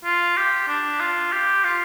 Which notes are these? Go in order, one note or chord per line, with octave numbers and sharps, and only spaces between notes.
F4
G4
D4
F4
G4
F4